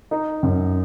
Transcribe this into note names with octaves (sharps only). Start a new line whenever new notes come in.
D#4
F#2